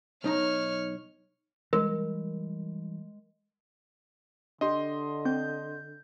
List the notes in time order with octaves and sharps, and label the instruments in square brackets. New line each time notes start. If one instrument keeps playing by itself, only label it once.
[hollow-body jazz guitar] B1 D#4 A#5 [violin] C#5 F6
[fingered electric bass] E3 G3 [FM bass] G#3 [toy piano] A#4
[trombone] D3 [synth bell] D4 G4 [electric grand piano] D#5 C6
[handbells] C4 [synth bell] G6